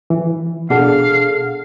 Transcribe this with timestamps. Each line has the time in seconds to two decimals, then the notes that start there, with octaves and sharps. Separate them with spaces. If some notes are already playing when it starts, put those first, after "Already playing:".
0.10 E3
0.70 B2 D4 G#4 A4 F5 F#5